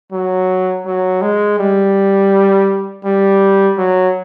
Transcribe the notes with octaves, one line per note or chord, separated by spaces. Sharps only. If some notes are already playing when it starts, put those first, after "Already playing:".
F#3
F#3
G#3
G3
G3
F#3